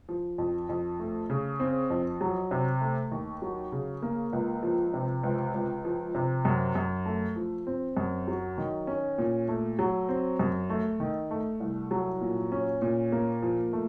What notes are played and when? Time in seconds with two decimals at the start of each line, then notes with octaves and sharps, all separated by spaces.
0.09 F3
0.38 F2
0.69 F2
0.99 A3
1.30 C#3
1.60 C4
1.90 F2
2.21 F#3
2.51 C3
2.81 A3
3.12 D#2
3.42 F#3
3.72 C#3
4.02 A#3
4.33 C#2
4.63 F3
4.94 C3
5.23 C#2
5.54 C#2
5.85 F3
6.15 C3
6.45 F#2
6.75 F#2
7.06 A3
7.36 F3
7.67 C4
7.97 F#2
8.28 F#3
8.58 D#3
8.87 C#4
9.18 A#2
9.48 A3
9.79 F#3
10.09 C4
10.39 F#2
10.69 A3
11.00 D#3
11.31 A3
11.60 C2
11.91 F#3
12.21 A#2
12.52 C#4
12.82 A#2
13.12 A#3
13.42 F3
13.73 A3